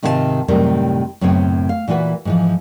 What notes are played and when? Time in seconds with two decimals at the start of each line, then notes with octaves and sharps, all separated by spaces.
0.03 G#2 C3 D#3 F4 C5 A5
0.48 F#2 A2 C3 D#3 G3 A#4
1.21 F#2 A2 C#3 B3 C4 C#5
1.69 F5
1.88 A#2 E3 F4 F#4 B4
2.25 G#2 E3 F3